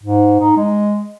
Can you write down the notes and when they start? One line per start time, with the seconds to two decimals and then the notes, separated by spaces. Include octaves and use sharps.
0.03 G#2
0.40 D#4
0.57 G#3